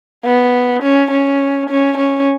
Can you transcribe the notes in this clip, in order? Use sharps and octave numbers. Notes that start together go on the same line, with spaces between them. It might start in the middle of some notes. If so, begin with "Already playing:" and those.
B3
C#4
C#4
C#4
C#4